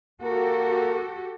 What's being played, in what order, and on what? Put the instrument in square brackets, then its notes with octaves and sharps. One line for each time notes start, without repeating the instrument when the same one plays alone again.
[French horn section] A#3 A#4 [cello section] F#4 G4 A4